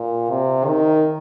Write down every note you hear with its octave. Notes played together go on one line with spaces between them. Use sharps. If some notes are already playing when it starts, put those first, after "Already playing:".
Already playing: A#2
C3
D#3